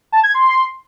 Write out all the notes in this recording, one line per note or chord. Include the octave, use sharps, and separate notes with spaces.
A5
G#6
C6